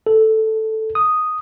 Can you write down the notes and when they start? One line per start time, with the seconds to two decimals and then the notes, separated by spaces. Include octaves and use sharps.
0.07 A4
0.95 D#6